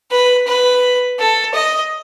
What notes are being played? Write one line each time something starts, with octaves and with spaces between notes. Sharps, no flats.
B4
B4
A4
D#5